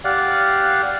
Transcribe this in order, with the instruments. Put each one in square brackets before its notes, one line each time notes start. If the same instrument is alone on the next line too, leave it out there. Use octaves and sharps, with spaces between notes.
[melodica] G4 D5 F5 F#5